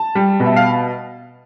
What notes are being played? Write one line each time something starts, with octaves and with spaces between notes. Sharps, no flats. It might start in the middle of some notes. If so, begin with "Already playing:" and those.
Already playing: A5
G3
B2
E5
F5